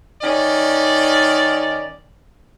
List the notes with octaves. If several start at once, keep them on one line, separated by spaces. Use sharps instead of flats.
D#3 C#4 D5